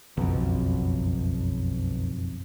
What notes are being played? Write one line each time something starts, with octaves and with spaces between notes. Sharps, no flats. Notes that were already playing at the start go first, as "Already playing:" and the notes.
F#1 B1 F2